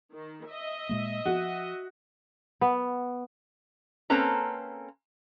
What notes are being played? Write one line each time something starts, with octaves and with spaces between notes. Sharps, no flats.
D#3
D#5 E5
A#2 G#3 A#3
F3 F#4
B3
A#3 C4 C#4 A4 B4 A#5